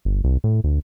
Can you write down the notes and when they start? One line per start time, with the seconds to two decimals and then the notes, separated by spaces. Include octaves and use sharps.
0.05 G1
0.24 C2
0.44 A2
0.64 D2